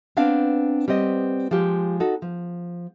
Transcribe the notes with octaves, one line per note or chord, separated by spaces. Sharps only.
B3 C4 D4 F5
G3 B3 C4 D#5
F3 G#3 F4 G4
D#4 F#4 A4
F3